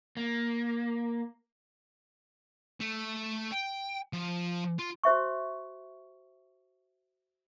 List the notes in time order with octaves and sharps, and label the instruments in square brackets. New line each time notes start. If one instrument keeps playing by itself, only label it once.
[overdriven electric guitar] A#3
[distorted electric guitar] A3
G5
F3
F4
[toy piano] F#4 C5 E5 C#6